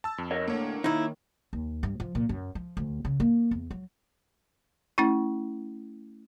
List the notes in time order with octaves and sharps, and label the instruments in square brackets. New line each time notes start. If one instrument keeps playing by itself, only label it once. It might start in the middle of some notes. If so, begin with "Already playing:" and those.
[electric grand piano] A5 E6
F2
[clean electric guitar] A#4 C#5 D#5
[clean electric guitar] A2 D3 [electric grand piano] A#3 C#5
[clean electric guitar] D#3 [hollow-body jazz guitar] D#4 E4
[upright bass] D#2
G2
F3
A#2
F#2
F3
D2
C#3
A#3
E2
F#3
[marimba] A3 C#4 E4